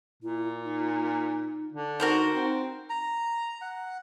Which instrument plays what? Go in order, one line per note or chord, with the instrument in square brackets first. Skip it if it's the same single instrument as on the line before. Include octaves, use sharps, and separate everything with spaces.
[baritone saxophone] A#2 [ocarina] E4
[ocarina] D#4
[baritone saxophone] D3
[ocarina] D#4 [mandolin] F#4 A#4 C5
[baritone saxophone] C4 [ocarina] D#4
[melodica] A#5
F#5